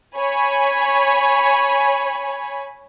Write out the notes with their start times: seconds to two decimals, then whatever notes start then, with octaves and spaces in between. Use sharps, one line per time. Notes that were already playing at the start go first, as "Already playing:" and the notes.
0.16 C#5 G#5 B5